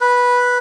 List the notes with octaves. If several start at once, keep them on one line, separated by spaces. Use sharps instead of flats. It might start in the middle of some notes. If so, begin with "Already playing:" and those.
B4